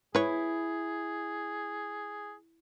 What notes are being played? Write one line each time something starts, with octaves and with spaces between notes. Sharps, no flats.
E4 G#4 B4 C#5